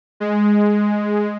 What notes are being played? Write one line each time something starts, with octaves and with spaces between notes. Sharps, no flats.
G#3